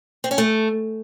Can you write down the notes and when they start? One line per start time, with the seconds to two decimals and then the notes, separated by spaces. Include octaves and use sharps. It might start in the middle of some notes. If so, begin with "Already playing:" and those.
0.24 C4
0.31 C#4
0.38 A3